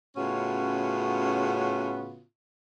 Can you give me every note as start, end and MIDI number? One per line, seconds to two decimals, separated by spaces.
0.17 2.21 45
0.17 2.21 49
0.17 2.21 59
0.17 2.21 61
0.17 2.21 65
0.17 2.21 66